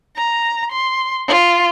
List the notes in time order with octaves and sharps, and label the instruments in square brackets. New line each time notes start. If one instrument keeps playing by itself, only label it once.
[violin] A#5
C6
F4